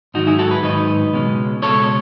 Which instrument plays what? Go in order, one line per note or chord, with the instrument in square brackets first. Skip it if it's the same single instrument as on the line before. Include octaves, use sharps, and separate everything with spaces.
[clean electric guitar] G#2 D#3 F#3 D#4 F#4
E4 G#4
F#4 A4
G#4 B4
G#2 D#3 F#3 B4 D#5
C#2 B2 G#3 C#4
C#2 B2 G#3 C#4 A4 C#5